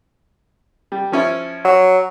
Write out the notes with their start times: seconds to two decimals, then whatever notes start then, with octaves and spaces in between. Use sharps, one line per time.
0.92 G3
1.12 F3 C#4 E4
1.65 F#3